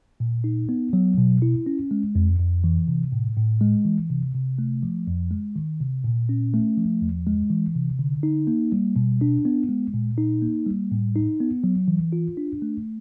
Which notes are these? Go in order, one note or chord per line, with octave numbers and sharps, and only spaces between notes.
A#2
D#4
B3
F#3
B2
E4
C#4
G#3
F2
F2
E3
C3
A2
A2
G#3
E3
C3
C3
A3
F3
F2
G#3
D#3
C3
A#2
C#4
A3
F3
E2
G#3
E3
C3
D3
D#4
A#3
G3
B2
D4
B3
G#3
A#2
D#4
A#3
G3
A2
D#4
B3
F#3
E3
F4
D4
A3